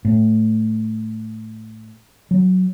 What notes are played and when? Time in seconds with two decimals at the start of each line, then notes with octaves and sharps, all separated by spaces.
0.05 A2
2.31 F#3